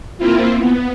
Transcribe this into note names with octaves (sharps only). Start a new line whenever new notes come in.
A#3 C4 E4 F4
B3